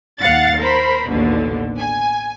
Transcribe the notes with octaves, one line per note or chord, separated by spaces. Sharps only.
D#2 F5 F#5 A6
A#4 C5 B5
A1 D#2 B2 D3
G#5